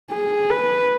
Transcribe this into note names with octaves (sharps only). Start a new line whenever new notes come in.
G#4
B4